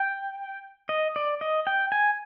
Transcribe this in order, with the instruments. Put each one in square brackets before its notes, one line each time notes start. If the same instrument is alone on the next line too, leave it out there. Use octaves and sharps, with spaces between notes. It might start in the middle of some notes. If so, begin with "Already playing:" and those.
Already playing: [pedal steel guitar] G5
D#5
D5
D#5
G5
G#5